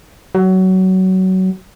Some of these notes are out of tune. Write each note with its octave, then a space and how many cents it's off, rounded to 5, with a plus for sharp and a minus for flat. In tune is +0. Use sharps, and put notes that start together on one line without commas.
F#3 +20